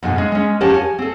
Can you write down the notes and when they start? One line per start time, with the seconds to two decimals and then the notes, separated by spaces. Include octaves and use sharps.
0.03 F2 G#2 B2 G#5
0.16 G#3 C#4
0.32 G#3 C#4
0.61 E2 F3 C#4 G4 A#4 A5
0.74 G#5
0.98 C4 A4